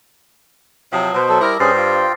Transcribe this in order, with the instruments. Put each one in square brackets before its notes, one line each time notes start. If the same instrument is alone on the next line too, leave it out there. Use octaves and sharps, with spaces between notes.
[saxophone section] C3 F3 [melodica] F#3 [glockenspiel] A5 D#6
[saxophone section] B2 [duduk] C5
[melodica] F#3 A4
[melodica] G3 [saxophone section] E4 A#4 [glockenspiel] D6 E6 A#6
[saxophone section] G2 [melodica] C#4 G#4 [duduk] C5 [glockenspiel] F6 A6 C7
[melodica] F4 G5